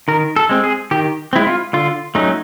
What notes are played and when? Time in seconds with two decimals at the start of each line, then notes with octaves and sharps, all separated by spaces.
0.08 D#3 A#4
0.36 A4
0.49 G#3 C4
0.64 G#4
0.91 D#3 G4
1.33 G#3 C4 E4
1.47 F4
1.73 D3 F4
2.15 F#3 A3 C#4 D#4